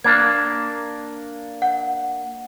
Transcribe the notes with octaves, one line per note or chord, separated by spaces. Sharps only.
A#3 D4 G#6
F#5